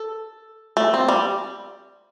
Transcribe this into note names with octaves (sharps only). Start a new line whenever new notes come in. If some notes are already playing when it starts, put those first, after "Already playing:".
Already playing: A4
A3
C4
G3